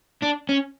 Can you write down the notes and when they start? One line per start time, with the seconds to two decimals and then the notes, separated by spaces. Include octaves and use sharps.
0.23 D4
0.49 C#4